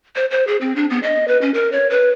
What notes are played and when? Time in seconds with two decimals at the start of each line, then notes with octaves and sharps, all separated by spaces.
0.16 C5
0.31 C5
0.47 G#4
0.61 C4
0.76 D4
0.90 B3
1.03 D#5
1.28 B4
1.41 C#4
1.54 A#4
1.72 C#5
1.90 B4